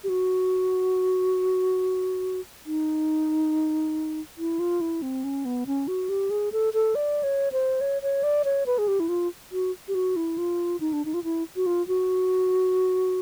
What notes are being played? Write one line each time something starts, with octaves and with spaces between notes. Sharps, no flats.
G4
F#4
D#4
E4
F4
E4
C4
C#4
B3
C#4
F#4
G4
G#4
A4
A4
D5
C#5
C5
C#5
C#5
D5
C#5
B4
G#4
G4
E4
F4
F#4
G4
F#4
E4
F4
D#4
D4
D#4
F4
E4
F#4
F4
F#4